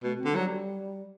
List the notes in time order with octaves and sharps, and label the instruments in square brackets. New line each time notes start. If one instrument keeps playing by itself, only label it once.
[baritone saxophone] B2 [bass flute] A3
[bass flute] C4
[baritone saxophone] D3
[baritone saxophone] F#3 [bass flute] G3